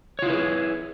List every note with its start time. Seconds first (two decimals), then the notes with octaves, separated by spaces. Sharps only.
0.19 C#5
0.22 F4
0.26 E4
0.30 B4
0.33 G#4